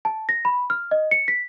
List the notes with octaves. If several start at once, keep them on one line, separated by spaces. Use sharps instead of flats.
A5
A#6
B5
F6
D#5
C#7
B6